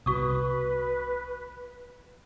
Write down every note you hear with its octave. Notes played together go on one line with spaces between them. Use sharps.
C2 C3 B3 F#4 B4 C#6 D#6